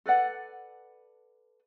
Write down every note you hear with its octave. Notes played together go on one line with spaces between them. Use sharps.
A4 B4 D5 F#5